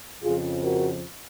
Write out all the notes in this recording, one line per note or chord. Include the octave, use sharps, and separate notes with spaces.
F2 C#3 F3 F4 G#4
F#4 A#4